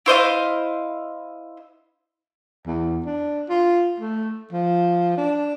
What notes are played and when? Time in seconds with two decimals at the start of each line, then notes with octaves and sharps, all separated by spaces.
0.06 E4 C5 D#5 F5
2.66 E2
3.06 D4
3.49 F4
4.00 A3
4.52 F3
5.17 D4